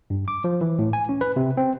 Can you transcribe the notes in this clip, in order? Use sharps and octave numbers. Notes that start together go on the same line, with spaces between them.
G2
D6
F3
E3
A2
G#5
C#4
B4
C3
C4